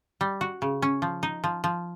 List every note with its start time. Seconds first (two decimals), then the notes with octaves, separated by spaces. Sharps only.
0.21 G3
0.41 F#4
0.62 C#3
0.82 C#4
1.02 F3
1.23 D#4
1.44 F3
1.64 F3